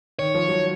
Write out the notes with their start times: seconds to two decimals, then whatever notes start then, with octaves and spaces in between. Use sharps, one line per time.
0.19 D#3 C#5
0.35 F3
0.49 F#3